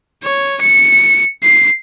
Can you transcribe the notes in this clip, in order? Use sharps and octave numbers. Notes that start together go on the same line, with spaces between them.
C#5
C#7
C7